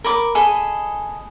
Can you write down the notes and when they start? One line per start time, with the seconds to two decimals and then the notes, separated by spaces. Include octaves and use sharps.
0.04 A#4 B5 D6
0.35 G#4 A4 D#5 B5